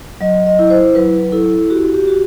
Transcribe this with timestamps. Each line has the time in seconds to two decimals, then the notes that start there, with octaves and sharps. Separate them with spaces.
0.21 F#3 D#5
0.47 D#5
0.59 E4
0.70 C5
0.95 F#3 B4
1.32 E4 A4
1.70 F#4 G4
1.94 G4
2.07 F#4